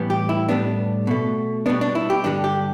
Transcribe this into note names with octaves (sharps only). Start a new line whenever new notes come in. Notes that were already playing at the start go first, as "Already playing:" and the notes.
Already playing: A2 E3 G3 B3
G4
E4
A2 G3 B3 D4
B2 A3
B2 G3 B3 D4
D4
E4
G4
G2 D3 G3 D4
G4